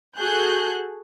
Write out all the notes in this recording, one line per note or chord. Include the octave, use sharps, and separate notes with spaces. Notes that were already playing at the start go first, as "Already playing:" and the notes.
F#4 G#4 A4 F#6 G6